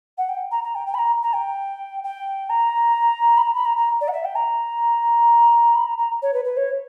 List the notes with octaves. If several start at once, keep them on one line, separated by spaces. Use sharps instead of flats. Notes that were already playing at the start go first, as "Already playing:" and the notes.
F#5
G5
A#5
A#5
G5
G5
B5
A#5
A#5
G5
G5
A#5
B5
A#5
B5
A#5
A#5
D5
F#5
E5
G5
A#5
B5
A#5
A#5
C#5
B4
B4
C#5